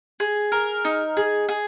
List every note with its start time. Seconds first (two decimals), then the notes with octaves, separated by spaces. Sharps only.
0.20 G#4
0.52 A#4
0.85 D#4
1.17 G#4
1.49 G#4